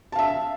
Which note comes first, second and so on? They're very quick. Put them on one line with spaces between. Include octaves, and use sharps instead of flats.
A5 F5 E5